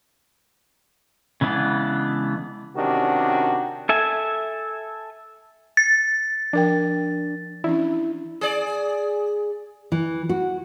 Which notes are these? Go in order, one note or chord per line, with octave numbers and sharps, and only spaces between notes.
C#3 E3 G#3 B3 D4
C3 D#3 C#4 D4 F#4 G4
A4 E5 G#5
A6
F3 D4 A#4 G5
E3 C#4 D4 E4
G#4 D5
E3
F#4